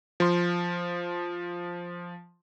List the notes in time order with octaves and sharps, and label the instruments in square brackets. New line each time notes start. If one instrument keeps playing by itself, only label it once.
[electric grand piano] F3 C6